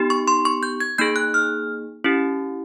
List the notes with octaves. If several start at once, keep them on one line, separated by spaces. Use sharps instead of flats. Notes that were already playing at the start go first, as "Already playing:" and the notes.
Already playing: B3 D#4 G4
C#6
C6
C#6
G6
G#6
A#3 D#4 G#4 G6
F#6
F6
C#4 E4 G4